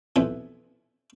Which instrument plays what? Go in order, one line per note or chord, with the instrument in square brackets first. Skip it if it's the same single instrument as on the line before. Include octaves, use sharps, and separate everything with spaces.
[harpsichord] B1 F2 E3